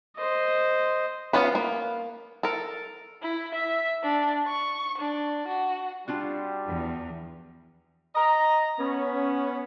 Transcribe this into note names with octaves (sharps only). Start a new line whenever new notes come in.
C5 D#5
B3 C#4 F4 B4
A#3
A4 A#4
E4
E5
D4
C#6
D4
F#4
G3 D4 F4 F#4
E2
D#5 A#5
B3 C#4